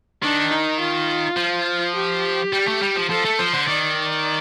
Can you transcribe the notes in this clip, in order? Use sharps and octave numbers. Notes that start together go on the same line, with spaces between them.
D#3 D4
D#4
F4
F3
G4
G3
A3
G3
F3
F3 A4
A3
F3 C5
D3
D#3 D5